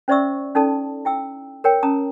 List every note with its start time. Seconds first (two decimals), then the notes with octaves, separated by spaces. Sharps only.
0.08 C#4 C5 D5 E5 C#6 E6
0.55 C#4 D#4 A4 D5 A5
1.05 E4 G5 E6
1.64 A#4 C#5 G5
1.83 C#4 A5 A#5 D#6